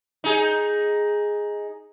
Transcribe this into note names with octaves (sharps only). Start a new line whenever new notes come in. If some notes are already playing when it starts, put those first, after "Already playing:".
D#4 G#4